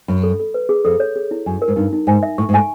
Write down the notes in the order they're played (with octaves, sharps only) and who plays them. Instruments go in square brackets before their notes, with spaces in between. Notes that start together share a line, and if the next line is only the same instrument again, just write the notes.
[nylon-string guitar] F#2 [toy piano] B5
[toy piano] A4
A4
B4
G#4
[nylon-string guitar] F2 [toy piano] A4
[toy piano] C#5
G#4
E4
[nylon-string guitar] F#2 [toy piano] G#5
[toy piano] A#4
[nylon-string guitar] G#2
[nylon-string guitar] G2 [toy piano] D#4
[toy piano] D#4
[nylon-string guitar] G#2 [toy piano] G#5
[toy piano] E5
[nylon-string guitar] A2 [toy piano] C#6
[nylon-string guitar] G#2
[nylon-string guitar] A2 [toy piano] G#5